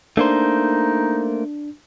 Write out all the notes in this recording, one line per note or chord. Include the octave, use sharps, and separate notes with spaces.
A3 A#3 D4 D#4 C5